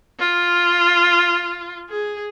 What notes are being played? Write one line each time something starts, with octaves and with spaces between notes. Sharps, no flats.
F4
G#4